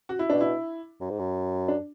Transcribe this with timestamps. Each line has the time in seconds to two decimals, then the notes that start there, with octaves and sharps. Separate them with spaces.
0.09 F#4
0.19 E4
0.30 B2 D4
0.40 E4
1.01 F#2
1.10 G#2
1.19 F#2
1.68 D4